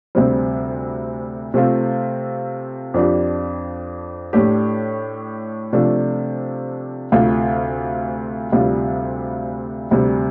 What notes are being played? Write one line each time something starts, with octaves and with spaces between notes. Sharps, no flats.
D2 C3 G3 C4
C3 A3 C4 F4
F2 F3 D4 G4
A2 A3 D4 G4
C3 F3 A3 D4
D2 C3 A3 F4
D2 C3 G3 F4
D2 C3 G3